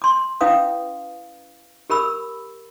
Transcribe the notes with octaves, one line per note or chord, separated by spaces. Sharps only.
C6 D6
C#4 E4 B4 F5 D#6
G4 A#4 B5 E6